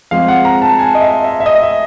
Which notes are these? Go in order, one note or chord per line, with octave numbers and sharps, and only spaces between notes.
F3 G#3 C4 F5
F#5
A#5
A5
G#5
D#5
E5
E5
E5
D#5
E5